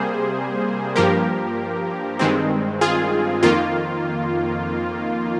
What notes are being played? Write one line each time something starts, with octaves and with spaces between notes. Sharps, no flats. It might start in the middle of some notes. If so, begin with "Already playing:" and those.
Already playing: C3 G3 A#3 G#4 C5
G2 F3 A#3 G4 A#4
G2 D#3 G#3 C4
F4 G#4
F2 D#3 A#3 F4